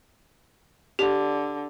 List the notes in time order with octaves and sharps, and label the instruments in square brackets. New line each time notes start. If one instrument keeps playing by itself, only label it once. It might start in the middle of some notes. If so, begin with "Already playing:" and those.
[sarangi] D3 [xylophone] G4